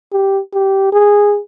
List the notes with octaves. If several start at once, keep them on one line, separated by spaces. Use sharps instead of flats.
G4
G4
G#4